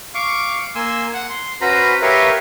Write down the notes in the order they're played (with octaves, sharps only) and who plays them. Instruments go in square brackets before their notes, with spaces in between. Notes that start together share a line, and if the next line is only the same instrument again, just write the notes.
[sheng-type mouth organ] F5 C#6 D6
A#3 G#5 C6 E6
F#5
C6
C#4 F#4 B4 C5 A#5 B5
G4 A#4 B4 C#5 E5 F5